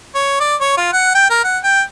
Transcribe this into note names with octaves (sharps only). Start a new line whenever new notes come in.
C#5
D5
C#5
F4
F#5
G5
A#4
F#5
G5